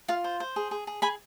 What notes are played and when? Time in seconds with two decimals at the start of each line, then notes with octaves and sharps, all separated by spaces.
0.08 F4 F5
0.24 C5
0.40 C5
0.56 G#4
0.71 G#4
0.87 G#4
1.02 G#4 G#5 B5